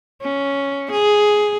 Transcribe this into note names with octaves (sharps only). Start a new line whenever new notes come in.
C#4
G#4